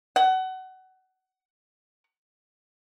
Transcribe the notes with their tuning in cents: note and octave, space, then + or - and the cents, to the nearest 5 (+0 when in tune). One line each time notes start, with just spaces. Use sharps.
F#5 +25